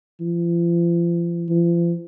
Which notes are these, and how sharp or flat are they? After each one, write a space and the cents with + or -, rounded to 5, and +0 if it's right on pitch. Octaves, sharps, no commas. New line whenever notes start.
F3 -40
F3 -40